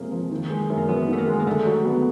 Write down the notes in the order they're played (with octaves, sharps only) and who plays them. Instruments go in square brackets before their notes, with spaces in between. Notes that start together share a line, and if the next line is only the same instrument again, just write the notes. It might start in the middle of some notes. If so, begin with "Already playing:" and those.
Already playing: [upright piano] F2 C3 F3 G#3 [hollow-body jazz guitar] A#3
[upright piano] F3
D#3
G#3
F#2
[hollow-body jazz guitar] A#3
[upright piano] F#2 [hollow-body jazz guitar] B3
[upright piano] D#3 [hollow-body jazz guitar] A3
[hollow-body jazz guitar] A#3
[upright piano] G#3
[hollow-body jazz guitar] A#3
[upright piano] D3 [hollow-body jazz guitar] A3
[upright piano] F#3
B3